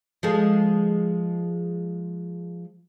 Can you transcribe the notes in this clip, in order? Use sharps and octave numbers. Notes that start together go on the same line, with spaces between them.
F3 G#3 A4